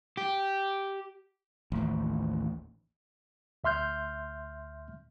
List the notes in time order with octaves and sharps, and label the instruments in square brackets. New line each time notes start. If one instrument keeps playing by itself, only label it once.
[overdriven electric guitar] G4
[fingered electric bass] A1 D#2
[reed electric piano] D2 E5 C6 F6 G6